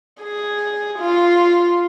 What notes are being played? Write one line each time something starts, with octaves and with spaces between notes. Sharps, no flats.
G#4
F4